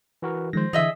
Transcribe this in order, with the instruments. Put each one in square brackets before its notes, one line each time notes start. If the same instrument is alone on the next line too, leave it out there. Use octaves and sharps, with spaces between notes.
[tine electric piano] E3 F#4 A#4
[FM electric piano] D#3 F3 G#3 [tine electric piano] C5 A#6
[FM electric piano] D3 E3 [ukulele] G#4 D#5 E5